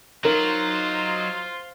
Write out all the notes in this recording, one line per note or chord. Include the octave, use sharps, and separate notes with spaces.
F#3 D#4 F4 A#4 C5